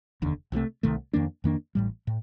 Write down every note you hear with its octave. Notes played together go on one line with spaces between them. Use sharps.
F1 D#2 D3
C2 C3 D#3 A3
C2 C3 D#3 A3
F2 D#3 A#3 D4
F2 D#3 A#3 D4
A1 A2 G3
A2